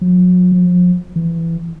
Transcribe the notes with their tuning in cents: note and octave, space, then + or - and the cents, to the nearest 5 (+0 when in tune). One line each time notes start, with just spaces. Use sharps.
F#3 -40
F3 +35
E3 +15